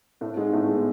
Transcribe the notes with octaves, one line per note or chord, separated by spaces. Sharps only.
A2 A3 C4
G#2 G#3
A2 A3 B3
G#3